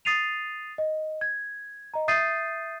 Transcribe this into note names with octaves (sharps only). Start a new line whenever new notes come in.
D#6 A6 C7 D#7 F7
D#5
G#6
D#5 A#5
E5 D#6 G6 A6 C7 D#7